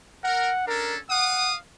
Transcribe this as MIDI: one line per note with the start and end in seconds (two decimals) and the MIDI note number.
0.24 0.51 70
0.24 0.65 78
0.67 0.98 61
0.67 0.98 62
0.67 0.98 69
0.67 0.94 70
1.10 1.57 77
1.10 1.51 78
1.10 1.57 87